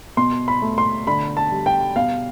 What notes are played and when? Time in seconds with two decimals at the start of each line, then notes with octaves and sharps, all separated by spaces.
0.17 B2 C6
0.48 B5
0.62 A3
0.78 C6
1.07 D3 B5
1.37 A5
1.51 G3
1.66 G5
1.96 B2 F5